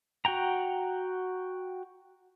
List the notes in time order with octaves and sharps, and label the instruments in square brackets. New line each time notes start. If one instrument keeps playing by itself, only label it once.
[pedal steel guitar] F#4 F#5 G5 A#5